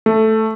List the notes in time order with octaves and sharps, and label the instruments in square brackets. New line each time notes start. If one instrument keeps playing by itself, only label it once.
[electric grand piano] A3